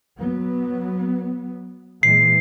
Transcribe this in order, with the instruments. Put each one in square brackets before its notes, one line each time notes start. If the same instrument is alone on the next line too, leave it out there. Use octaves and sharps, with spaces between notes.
[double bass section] F#3 B3
[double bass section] A#2 E3 G#3 [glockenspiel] C7